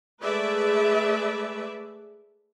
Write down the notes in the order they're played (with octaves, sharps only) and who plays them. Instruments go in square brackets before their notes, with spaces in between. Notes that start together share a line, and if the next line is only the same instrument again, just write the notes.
[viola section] G#3 A3 G#4 B4 D5 E5